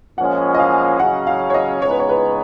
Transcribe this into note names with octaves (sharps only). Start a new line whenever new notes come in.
A#2 F3 G#3 C#4 F#5
D#5
F5
C#3 F#3 C#4 F#5
F5
C#5
D#5
C#2 C#3 G#3 B3 D#4 C#5
B4
C#5
B4